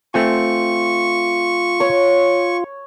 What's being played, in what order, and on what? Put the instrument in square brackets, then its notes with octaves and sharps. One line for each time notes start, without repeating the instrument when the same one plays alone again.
[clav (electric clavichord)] A3 C4 G#5 [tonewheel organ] F4 [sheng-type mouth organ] C#6
[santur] C#5